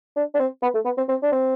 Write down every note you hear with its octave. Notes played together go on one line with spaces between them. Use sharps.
D4
D4
C4
B3
A3
B3
C4
C4
D4
C4